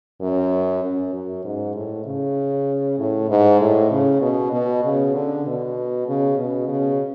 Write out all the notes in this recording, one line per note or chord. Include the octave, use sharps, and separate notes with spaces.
F#2
F#2
F#2
G#2
A2
C#3
A2
G#2
A2
C#3
B2
B2
C#3
D3
B2
C#3
B2
C#3